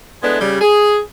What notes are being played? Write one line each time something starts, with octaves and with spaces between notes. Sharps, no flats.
G#3 B3 D4 E4 A4
C#3 G3
G#4